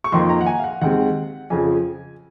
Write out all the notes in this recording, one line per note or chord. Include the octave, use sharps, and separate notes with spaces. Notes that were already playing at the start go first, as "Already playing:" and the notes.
C#6
F2 D#3 A#3 C6
A#5
F#5
G#5
F5
F#5
D#2 D#3 G#3 C4 F#5
F2 C#3 F3 G#5